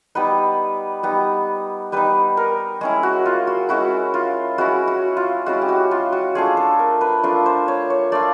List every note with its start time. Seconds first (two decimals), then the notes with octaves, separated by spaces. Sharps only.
0.15 G3 B3 D#4 B4
1.03 G3 B3 D#4
1.92 G3 B3 D#4 B4
2.37 A#4
2.81 G#3 C#4 E4 G#4
3.03 F#4
3.26 F4
3.47 F#4
3.69 G#3 C#4 E4 F#4
4.14 F4
4.58 G#3 C#4 E4 F#4
4.88 F#4
5.17 F4
5.46 G#3 C#4 E4 F#4
5.61 G4
5.69 F#4
5.91 F4
6.12 F#4
6.35 A3 D4 F4 G#4
6.57 A4
6.79 A#4
7.01 B4
7.23 A3 D4 F4 A#4
7.46 C5
7.68 C#5
7.90 C#5
8.12 A3 D4 F4 D5